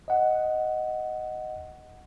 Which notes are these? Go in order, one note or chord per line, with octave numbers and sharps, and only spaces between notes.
D#5 F#5